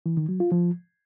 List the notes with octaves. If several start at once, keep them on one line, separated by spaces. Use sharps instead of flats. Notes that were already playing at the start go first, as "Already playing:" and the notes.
E3
D#3
F#3
F4
F3